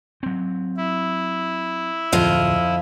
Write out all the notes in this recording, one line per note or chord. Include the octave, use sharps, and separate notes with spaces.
F#3 C4
E4
D1 F2 F4 D#5